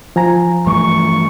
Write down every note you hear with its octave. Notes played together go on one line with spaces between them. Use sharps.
F3 G#5 A#5
G2 E3 A3 C#6